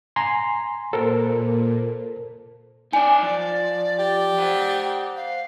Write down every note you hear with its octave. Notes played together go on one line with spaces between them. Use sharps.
G#5 A#5 C6
A#2 A4 A#4 C5
D#4 D5 G5 G#5
F3 D5
G4
C5 F#5
F5